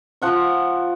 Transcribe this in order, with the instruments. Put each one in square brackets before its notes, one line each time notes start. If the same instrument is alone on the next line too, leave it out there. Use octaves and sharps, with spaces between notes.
[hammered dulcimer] F3 F#5 C#6